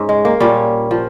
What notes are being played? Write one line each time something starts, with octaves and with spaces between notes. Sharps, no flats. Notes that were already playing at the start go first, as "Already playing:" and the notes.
Already playing: G#2 C#4
G#3
A#3
A#2 G3 C#4
F3